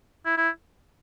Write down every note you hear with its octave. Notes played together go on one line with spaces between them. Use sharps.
E4
E4